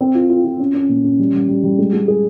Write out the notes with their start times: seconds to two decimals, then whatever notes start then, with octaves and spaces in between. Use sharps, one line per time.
0.01 C4
0.15 F4
0.30 F4
0.44 F4
0.60 C#4
0.74 C#4
0.89 A#2
1.04 C#4
1.19 G3
1.33 G3
1.48 G3
1.64 G3
1.79 G#3
1.93 G#3
2.08 G#4